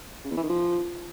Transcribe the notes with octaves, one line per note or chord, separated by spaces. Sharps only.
C#3
E2
E3
D#3
F3